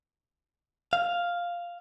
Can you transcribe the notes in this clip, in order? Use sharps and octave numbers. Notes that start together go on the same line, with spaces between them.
F5